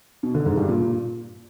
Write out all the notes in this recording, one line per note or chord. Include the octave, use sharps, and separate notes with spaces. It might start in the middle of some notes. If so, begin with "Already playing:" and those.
B2
D3
G#2
G2
A#2